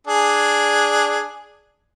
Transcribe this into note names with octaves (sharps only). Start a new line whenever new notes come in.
D4 G#4